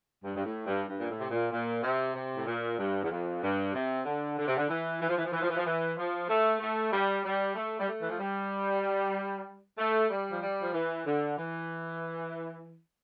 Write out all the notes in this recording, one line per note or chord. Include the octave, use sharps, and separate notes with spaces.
G2
G2
A2
G2
G2
A#2
A2
C3
A#2
A#2
C3
C3
A2
A#2
G2
E2
F2
G2
C3
D3
D3
C3
D3
E3
E3
F3
E3
F3
E3
F3
E3
F3
E3
F3
A3
A3
G3
G3
A3
G3
A3
E3
F3
G3
A3
G3
F3
G3
F3
E3
D3
E3